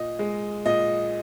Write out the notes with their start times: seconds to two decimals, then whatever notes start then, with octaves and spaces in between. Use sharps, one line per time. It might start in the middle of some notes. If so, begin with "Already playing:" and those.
Already playing: A#2 D#5
0.19 G#3
0.65 A#2 D#5